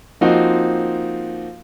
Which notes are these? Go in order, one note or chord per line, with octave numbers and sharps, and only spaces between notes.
F3 A#3 C4 D#4 F#4